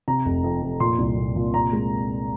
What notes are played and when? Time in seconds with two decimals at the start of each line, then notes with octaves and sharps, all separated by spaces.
0.08 C3 A#5
0.25 F1
0.44 F2
0.62 F2
0.80 A#2 C6
0.99 C2
1.17 A#2
1.36 A#2
1.54 C3 A#5
1.73 G#3